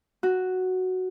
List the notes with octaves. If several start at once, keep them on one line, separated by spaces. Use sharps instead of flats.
F#4